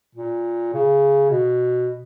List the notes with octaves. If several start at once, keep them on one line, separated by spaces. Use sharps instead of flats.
A#2
C#3
B2